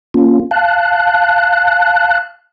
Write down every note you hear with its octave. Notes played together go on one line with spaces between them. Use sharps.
A#3 C#4 F4
F5 A5 F#6